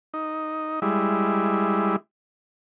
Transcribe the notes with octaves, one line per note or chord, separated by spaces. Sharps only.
D#4
G3 G#3 E4